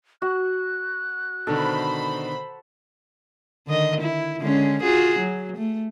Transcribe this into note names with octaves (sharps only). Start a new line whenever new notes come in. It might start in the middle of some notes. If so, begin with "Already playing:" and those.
F#4 F#6
B2 D3 D#3 A4 C5 B5
D3 D#3 D#5
E4
D3 G#3 C#4
F4 F#4 G#4
F#3
A3